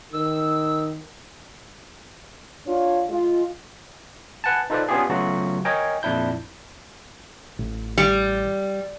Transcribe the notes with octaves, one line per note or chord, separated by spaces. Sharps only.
D#3 E6
D4 F4 C#5
G#3 F4
B4 F#5 G#5 A5
D#4 F4 A4 B4 C5 D5
B3 C#4 D4 F4 G4 G#4
C#3 F#3 A3 B3 F4 F#4
A#4 C#5 D#5 G5 G#5
F2 A#2 D4 E4 G6
A1
G3